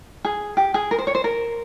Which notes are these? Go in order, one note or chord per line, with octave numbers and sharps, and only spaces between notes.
G#4
G4
G#4
A#4
C5
C#5
C5
A#4